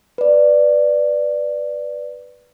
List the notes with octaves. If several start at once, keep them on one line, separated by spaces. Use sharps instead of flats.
B4 D5